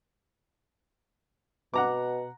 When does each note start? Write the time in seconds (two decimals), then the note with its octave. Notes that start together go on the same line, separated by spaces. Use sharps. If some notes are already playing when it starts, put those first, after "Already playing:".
1.74 B2 F#5 A#5 D6